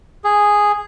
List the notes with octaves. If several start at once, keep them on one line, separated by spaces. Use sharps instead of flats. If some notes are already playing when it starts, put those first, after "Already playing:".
G#4